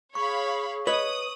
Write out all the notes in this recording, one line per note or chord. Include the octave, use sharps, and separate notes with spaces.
G#4 C#5 F5 B5 C#6
B4 C#5 D#5 D#6 F#7